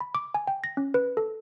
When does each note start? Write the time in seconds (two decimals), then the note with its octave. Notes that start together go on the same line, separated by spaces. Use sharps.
0.01 B5
0.15 D6
0.34 G#5
0.47 G5
0.64 A#6
0.77 C#4
0.94 B4
1.17 A4